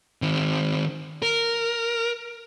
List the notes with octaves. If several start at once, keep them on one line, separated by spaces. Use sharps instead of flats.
D#3 C4
A#4